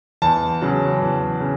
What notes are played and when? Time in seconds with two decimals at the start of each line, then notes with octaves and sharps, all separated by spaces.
0.22 E2 A5
0.62 C#3 F#3
1.01 E2
1.40 C#3